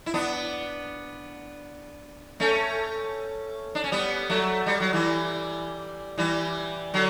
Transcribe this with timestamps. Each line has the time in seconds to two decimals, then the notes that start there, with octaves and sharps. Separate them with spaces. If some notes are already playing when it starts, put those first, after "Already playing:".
0.06 E4
0.14 B3 D4
2.40 A3 C#4
3.75 D4
3.84 C#4
3.92 G3 B3
4.30 F#3 A3
4.66 G3
4.80 F#3
4.93 E3 G3
6.18 E3 G3
6.94 D3 F#3